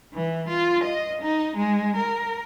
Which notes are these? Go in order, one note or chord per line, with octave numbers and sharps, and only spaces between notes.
E3
F4
D#5
D#4
G#3
A#4